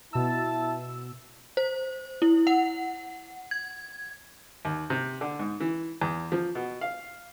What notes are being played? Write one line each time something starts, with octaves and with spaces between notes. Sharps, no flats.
B2 E4 A5 E6
C5
E4
F#5
G#6
D#2
C3
D3
G#2
E3
E2
F3
B2
F5